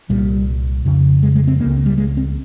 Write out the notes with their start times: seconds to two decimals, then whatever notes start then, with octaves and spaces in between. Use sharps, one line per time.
0.09 C2 A#2 G3
0.85 F2 C#3
1.23 G#3
1.35 G#3
1.47 C4
1.60 C#2 C#3 A#3
1.86 G3
1.98 G#3
2.17 C4